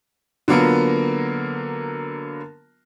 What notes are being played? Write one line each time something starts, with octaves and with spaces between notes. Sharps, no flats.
D3 F#3 A#3 B3 F4 A#4